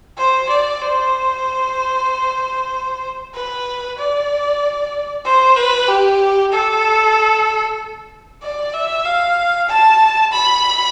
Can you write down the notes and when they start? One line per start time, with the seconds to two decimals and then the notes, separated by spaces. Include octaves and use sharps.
0.17 C5
0.49 D5
0.80 C5
3.34 B4
3.98 D5
5.25 C5
5.56 B4
5.88 G4
6.52 A4
8.42 D5
8.73 E5
9.05 F5
9.68 A5
10.32 B5